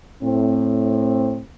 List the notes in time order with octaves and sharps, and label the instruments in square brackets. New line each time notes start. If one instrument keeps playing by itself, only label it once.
[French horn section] A2 C4